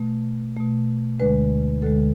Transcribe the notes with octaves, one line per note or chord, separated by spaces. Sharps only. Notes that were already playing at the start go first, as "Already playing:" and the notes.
Already playing: B2 A3
B2 A3
D2 D3 G#3 B4
D2 D3 G#3 A4